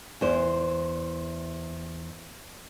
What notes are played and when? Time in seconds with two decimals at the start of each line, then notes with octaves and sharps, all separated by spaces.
0.21 E2 C5